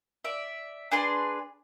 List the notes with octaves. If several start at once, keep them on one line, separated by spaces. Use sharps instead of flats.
D5 E5
D4 G#4 B4 C6